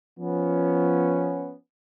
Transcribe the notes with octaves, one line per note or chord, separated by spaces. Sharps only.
F3 B3 C#4